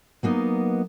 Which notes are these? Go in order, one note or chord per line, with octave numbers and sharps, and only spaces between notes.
F#3 A#3 B3 D#4